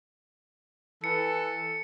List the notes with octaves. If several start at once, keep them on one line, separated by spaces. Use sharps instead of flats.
E3 A4 C#7